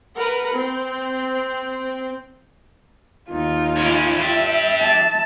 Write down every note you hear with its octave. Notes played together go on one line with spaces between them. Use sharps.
A#4 B4 F#5 A#5
C4
D#2 D#4 F4
A2 C#4
D4 G4 E5
A5